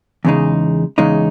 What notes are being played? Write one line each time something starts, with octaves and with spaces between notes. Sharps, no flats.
E2 C#3 G#3 D#4
E2 C#3 G#3 D#4